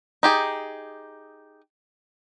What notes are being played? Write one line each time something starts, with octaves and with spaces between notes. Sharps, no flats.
D#4 G4 G#4